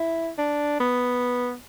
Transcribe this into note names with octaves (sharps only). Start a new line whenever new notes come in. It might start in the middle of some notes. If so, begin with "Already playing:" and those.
Already playing: E4
D4
B3